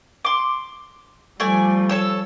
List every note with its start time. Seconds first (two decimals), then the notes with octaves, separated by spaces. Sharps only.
0.25 C6 D6
1.40 F3 G3 A3 D5 G#5
1.89 A4 C#5 E6